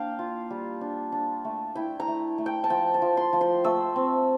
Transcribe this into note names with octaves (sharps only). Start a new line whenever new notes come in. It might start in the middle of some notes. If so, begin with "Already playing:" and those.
Already playing: A#3 D4 F5 G5
F4
G3
D4
D4
A3
E4 G5
A#5
A3
A3
G5
A5
F3 G5
A5
F3
C6
F3
C6
A3 E6
C4